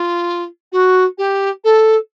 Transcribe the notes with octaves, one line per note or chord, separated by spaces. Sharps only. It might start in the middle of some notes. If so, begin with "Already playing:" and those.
Already playing: F4
F#4
G4
A4